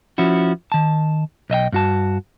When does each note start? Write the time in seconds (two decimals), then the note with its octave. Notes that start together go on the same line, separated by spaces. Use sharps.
0.18 F3 C#4 E4 F#4
0.72 D#3 A5
1.50 B1 D#5 E5 G5
1.72 G2 F#4 A5